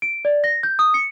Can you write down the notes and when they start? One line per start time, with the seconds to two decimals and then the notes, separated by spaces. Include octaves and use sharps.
0.02 D7
0.25 D5
0.44 A#6
0.63 G6
0.79 D#6
0.94 C#7